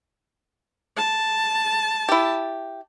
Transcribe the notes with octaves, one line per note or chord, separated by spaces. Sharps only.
A5
E4 G4